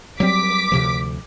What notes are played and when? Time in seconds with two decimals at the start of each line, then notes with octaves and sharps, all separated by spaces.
0.20 F#3 G3 C4 D6 B6
0.72 D2 C3 F3